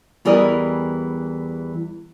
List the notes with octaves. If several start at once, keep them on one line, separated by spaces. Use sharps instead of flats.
E2 E3 G3 A#4 D#5